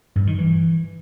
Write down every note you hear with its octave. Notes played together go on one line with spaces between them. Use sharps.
G2
D#3
E3